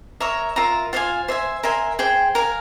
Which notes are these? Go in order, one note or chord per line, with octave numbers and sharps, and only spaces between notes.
A#4 C#5 E5 A#5
F4 A#4 E5 A#5
F4 C5 F5 G#5
C5 E5 G#5
A#4 E5 G#5 C6
G#4 C5 G5 C6
A#4 F5 G#5